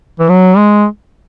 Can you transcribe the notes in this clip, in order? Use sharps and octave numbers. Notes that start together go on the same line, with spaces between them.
E3
F#3
G#3